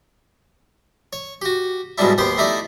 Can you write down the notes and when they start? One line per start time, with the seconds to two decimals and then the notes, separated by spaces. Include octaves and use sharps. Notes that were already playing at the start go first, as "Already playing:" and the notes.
1.13 C#5
1.42 F#4 G4
1.98 G#2 B2 F#3 G3 D4 E4
2.18 D#2 B3 G4 C5 G5 C6
2.38 A3 D#4 E4 G4 D5